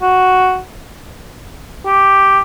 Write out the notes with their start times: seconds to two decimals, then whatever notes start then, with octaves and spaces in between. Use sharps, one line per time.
0.02 F#4
1.86 G4